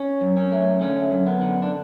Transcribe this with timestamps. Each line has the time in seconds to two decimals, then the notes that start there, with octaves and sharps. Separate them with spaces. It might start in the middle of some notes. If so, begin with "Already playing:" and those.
Already playing: C#4
0.21 F#2
0.37 C#4
0.52 A3
0.81 D3 C#4
1.11 F#2
1.26 B3
1.41 D3
1.62 D4